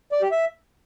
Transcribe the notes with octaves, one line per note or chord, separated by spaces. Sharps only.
D5
G4
E5